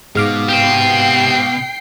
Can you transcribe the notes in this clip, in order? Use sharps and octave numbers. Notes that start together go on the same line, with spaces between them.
G#2 B2 F5 D6
G4 C5 G5 C7